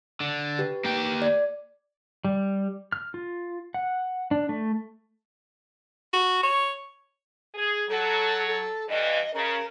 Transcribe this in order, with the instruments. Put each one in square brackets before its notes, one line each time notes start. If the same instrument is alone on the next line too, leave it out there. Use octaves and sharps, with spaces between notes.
[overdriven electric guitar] D3
[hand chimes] G4 B4
[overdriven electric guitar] A#3 G5
[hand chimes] D5
[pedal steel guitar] G3
F6
F4
F#5
D4
A3
[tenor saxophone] F#4
C#5
[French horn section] G#4
[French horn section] F#3 [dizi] A4
[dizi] A4
[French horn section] G2 E3 [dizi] D#5
[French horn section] C#3 [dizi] A#4